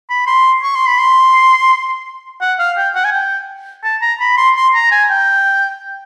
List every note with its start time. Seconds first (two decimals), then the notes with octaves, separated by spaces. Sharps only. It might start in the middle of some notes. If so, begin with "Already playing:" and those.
0.10 B5
0.27 C6
0.63 C#6
0.75 C6
0.87 B5
0.99 C6
2.41 F#5
2.59 F5
2.77 G5
2.95 F#5
3.05 G#5
3.12 G5
3.84 A5
4.02 A#5
4.20 B5
4.37 C6
4.56 C6
4.74 A#5
4.92 G#5
5.10 G5